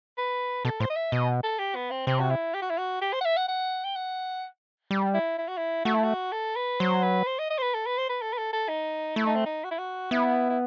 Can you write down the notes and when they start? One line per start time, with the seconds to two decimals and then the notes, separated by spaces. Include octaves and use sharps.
0.18 B4
0.65 B2 A4
0.80 A2 C5
0.90 D#5
0.96 E5
1.12 B2 D#5
1.44 A4
1.59 G4
1.76 B3
1.91 C4
2.07 C3 C4
2.20 F#4
2.31 E4
2.54 G4
2.62 F#4
2.70 E4
2.78 F#4
3.01 G4
3.13 C5
3.21 F#5
3.25 E5
3.37 F#5
3.48 F#5
3.84 G5
3.96 F#5
4.91 G3
5.14 E4
5.38 E4
5.48 F#4
5.57 E4
5.85 A3 F#4
5.95 E4
6.04 F#4
6.32 A4
6.56 B4
6.80 F#3 C5
7.03 B4
7.27 C5
7.39 D#5
7.51 D#5
7.58 C5
7.62 B4
7.74 A4
7.86 B4
7.98 C5
8.09 B4
8.22 A4
8.33 B4
8.38 A4
8.53 A4
8.69 D#4
9.16 A3 E4
9.26 D#4
9.36 C4
9.46 D#4
9.64 F#4
9.71 E4
9.79 F#4
10.11 B3 E4
10.50 E4